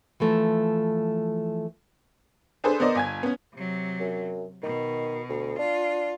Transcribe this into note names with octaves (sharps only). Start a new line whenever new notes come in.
E3 F3 A3
D4 G#4 A4 B4 C5
B3 A#4 C5 D5 D#5
G1 G#5 G#6
B3 C#4
C3 F#3
F#2
B2 D#3
D2
D4 F4